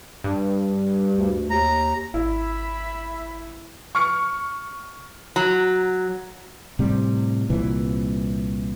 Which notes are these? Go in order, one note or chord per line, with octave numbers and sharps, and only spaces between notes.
G2
D2
D#2 A#5
G#1 E4 E5 B5
C#6 F6 C#7
F#3 A#5
A2 C3 G3
C2 A#2 E3